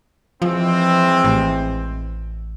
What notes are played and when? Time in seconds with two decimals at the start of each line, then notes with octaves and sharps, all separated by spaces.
0.42 E3 F3 G#3 C4
1.24 A1